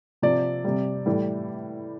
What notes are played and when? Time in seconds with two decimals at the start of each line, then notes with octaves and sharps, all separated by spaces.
0.22 C3 F3 D5
0.64 C3 G3
1.06 A2 E3 G3